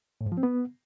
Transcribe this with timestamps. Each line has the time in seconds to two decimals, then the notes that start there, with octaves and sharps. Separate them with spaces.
0.21 A2
0.26 G#2
0.32 F3
0.38 C4
0.43 B3